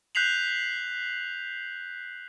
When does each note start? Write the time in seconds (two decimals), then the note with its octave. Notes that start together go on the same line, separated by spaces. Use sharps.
0.15 F#6 G6 B6 C7 F7 F#7